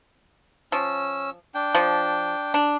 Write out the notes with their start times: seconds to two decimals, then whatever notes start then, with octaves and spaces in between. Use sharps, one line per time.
0.72 F3 C#4 E6
1.54 D4 G5
1.75 F3
2.54 D4